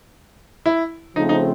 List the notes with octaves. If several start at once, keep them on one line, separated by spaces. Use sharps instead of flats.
E4
C#3 F3 A3 C4 D#4
D#4